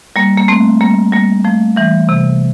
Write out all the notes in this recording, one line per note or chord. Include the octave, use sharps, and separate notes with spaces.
G3 A#3
A#3
A3 C4
G3 A#3
G3 A#3
F3 A3
E3 G3
C3 E3